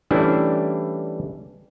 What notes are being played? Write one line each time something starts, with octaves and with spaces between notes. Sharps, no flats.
E3 G3 A3 C#4 D4 E4